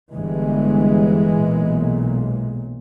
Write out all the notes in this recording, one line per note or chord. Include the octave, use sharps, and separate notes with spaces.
G1 G2 E3 G#3
B1 A#2